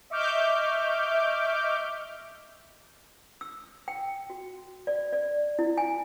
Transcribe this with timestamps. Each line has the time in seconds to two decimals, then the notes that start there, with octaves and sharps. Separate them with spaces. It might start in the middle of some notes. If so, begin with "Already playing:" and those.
0.10 D#5 E5 C#6 D6 F6 G6
3.41 E6
3.88 G5
4.30 F#4
4.87 D5
5.13 D5
5.59 E4
5.78 G#5